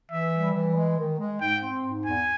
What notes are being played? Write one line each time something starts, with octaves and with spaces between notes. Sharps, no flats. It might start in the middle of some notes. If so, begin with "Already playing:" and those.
E3 E5
G3
E3
G#3
D#3
G#3
G#2 G5
C4
G#2
E2 G#5